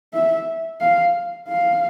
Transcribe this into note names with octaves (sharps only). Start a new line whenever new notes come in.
E5
F5
F5